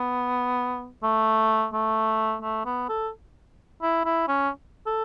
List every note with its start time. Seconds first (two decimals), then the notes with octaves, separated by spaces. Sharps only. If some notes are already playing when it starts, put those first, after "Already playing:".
Already playing: B3
1.03 A3
1.73 A3
2.42 A3
2.66 B3
2.89 A4
3.82 E4
4.05 E4
4.28 C#4
4.86 A4